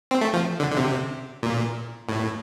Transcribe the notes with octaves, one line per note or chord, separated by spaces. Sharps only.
C4
A3
F3
D3
D3
C3
A#2
A2